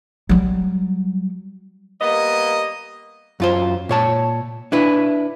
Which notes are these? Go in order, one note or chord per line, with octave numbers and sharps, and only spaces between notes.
F#3 G3
G3 A#3 B3 D#5
F#2 F4 C5
A#2 C#5 A5
D4 E4 B4